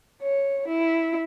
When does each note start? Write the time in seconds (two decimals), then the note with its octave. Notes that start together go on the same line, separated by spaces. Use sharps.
0.21 C#5
0.67 E4